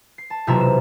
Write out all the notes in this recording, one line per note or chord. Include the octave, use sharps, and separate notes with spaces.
C7
A5
E1 B1 C3 F4 E5 A#5
E7